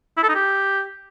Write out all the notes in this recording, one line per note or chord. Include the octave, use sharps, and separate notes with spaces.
E4
A4
D#4
G4